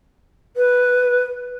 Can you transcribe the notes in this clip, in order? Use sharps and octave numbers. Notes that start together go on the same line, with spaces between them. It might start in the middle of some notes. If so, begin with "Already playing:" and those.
B4